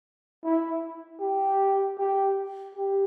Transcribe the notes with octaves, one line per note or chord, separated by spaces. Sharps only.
E4
G4
G4
G4